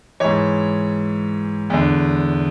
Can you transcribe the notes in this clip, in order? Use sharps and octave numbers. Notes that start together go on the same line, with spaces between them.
G#2 E3 C#5
E2 D3